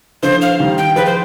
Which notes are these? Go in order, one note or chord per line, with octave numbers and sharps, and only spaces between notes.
D3 F3 C5
F5
D#3 G3
G5
F3 G#3 B4
C5